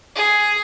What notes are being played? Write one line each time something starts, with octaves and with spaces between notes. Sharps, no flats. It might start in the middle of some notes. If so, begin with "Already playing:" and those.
G#4